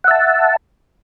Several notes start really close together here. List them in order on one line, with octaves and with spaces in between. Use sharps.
F#5 E5 A5